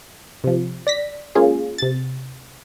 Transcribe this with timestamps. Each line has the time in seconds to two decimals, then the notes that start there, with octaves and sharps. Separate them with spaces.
0.44 C3 F3
0.87 D5 A#6 B6
1.35 G#3 A#3 C#4 F4 G#4
1.78 C3 A6